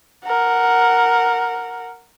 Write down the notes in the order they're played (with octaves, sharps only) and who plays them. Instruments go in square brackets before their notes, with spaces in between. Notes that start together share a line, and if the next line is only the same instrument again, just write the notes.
[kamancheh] A#4 F#5